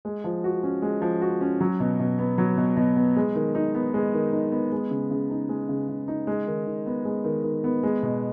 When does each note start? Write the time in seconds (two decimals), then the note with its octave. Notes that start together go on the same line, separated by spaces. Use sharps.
0.05 G#3
0.24 F3
0.44 F#4
0.63 C#4
0.82 G#3
1.02 F3
1.22 F#4
1.41 C#4
1.61 F#3
1.80 B2
2.00 B2
2.19 B3
2.38 F#3
2.58 B2
2.77 B2
2.96 B3
3.16 G#3
3.35 D#3
3.55 D#4
3.75 B3
3.94 G#3
4.14 D#3
4.33 D#4
4.52 B3
4.72 G#3
4.91 C#3
5.11 C#3
5.30 D#4
5.49 G#3
5.69 C#3
5.89 C#3
6.08 D#4
6.27 G#3
6.47 D#3
6.67 D#3
6.86 B3
7.05 G#3
7.24 D#3
7.44 D#3
7.64 B3
7.83 G#3
8.03 B2